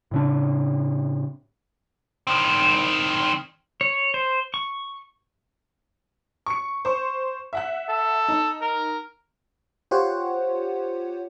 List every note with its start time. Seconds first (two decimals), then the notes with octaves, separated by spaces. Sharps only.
0.11 A2 C#3 D4
2.27 D#3 C4
3.81 C#5
4.14 C5
4.54 C#6
6.46 C#6 C#7
6.85 C5 C#6
7.53 E5 F#5 F#6
7.89 A4
8.28 D#4
8.61 A#4
9.91 F4 G4 C5 C#5 F#5